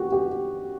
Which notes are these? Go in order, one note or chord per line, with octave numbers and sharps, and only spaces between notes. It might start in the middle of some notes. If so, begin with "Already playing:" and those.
Already playing: F#4 G4
G4